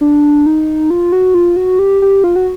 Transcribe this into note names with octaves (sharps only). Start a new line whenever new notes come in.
D4
D#4
F4
F#4
F4
F#4
G4
G4
F4
F#4